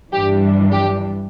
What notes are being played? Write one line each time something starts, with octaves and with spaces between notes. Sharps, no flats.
G2 E3 G3 D4 G4
G4